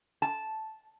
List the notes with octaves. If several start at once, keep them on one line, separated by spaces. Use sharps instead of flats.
A5